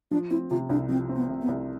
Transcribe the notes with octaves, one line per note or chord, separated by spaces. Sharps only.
F3 D4
C4 E4
C3 F4
C2 D4
F3 C4
C4
B3
C3
B3
C2